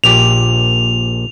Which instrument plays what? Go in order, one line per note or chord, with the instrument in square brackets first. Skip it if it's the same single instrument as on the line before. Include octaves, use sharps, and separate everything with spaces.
[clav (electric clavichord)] A#1 A#2 G4 [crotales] F7